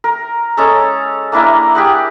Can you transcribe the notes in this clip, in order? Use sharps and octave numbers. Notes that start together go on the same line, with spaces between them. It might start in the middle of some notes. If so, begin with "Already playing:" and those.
A#4
G#3 C#4 A4 A#5
A#3 D4 E4 A#4
G4 G#4 F#5